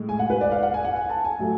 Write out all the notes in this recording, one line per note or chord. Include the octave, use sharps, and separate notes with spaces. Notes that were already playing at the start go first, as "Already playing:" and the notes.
Already playing: A2 G#3
G#5
F#5
B4
D5
F5
F#5
G#5
F#5
G#5
A5
G#5
A2 F#3 A3